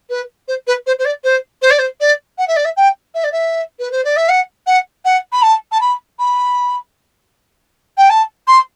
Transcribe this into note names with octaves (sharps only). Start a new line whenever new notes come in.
B4
C5
B4
C5
C5
D5
C5
C5
D5
C5
D5
F#5
E5
D5
E5
G5
E5
D5
E5
B4
C5
D5
E5
F#5
F#5
F#5
B5
A5
A5
B5
B5
G5
A5
C6